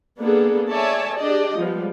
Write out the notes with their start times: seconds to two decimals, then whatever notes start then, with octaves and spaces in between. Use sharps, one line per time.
0.20 A#3 B3 D4 G#4 A4
0.70 A4 C#5 D5 E5 G#5 A5
1.19 D4 G4 G#4 D5 D#5
1.58 F3 G3 G#3 B3